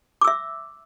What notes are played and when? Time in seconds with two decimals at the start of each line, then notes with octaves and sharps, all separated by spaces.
0.21 D6
0.24 E6
0.27 E5